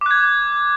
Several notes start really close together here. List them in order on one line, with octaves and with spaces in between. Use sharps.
D6 F#6 G#6